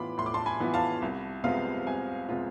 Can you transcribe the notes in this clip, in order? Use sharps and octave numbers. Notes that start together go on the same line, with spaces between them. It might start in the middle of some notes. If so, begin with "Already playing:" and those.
Already playing: A2 E3 B3 F4 B5 C6 D6
A2 C6
D6
A5 C6
G#5 B5
E3 B3 F4
F5 A5
C2
C3 G#3 B3 F4 F5
C2 G#5
C3 G#3 B3 F4